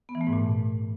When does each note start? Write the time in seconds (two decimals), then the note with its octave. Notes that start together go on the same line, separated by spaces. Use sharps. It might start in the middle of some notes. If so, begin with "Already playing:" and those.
0.09 B3
0.15 E3
0.21 A3
0.27 G#2
0.33 A#2